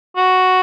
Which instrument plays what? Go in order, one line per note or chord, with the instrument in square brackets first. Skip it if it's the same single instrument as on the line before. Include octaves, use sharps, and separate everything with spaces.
[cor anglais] F#4